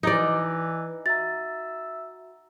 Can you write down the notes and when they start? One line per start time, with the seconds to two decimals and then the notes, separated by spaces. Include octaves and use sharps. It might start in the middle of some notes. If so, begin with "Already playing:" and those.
0.03 E3 D#4 E4 D5 D#5 D6
1.06 F#4 E5 A#5 A6